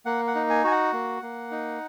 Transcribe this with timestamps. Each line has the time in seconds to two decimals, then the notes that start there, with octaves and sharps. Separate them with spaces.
0.06 A#3 F#5
0.27 F#5
0.35 D#4
0.50 G#5
0.64 F#4 G#5
0.71 F#5
0.93 A#3
1.22 A#3
1.51 D#4